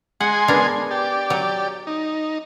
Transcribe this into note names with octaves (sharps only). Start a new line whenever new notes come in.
G#3 F#5 G#5 C6
B3 D4 A#4
G4 D5
F#3
D#4